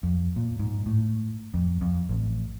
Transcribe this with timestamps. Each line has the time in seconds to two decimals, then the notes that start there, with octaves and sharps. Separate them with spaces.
0.03 F2
0.36 A#2
0.59 G#2
0.86 A2
1.54 F2
1.81 F2
2.09 A1